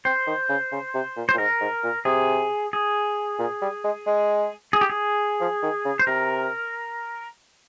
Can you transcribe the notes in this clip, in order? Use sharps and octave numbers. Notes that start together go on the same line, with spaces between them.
C4 C5
D#3
C#3
C#3
C3
A#2
C5
A#2
G#2 A#4
G#2
A#2
C3 G#4
G#4
A#2
G3
G#3
G#3
G#4
G4
G#4
F3
D#3
C#3
C5
C3 A#4